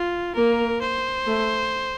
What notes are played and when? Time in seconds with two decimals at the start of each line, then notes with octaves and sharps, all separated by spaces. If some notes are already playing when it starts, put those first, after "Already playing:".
Already playing: F4
0.35 A#3 A#4
0.81 C5
1.27 A3